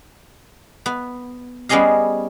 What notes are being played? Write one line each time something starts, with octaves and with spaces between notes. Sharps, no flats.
B3
G3 B3 C#4 G#4 D#5 F5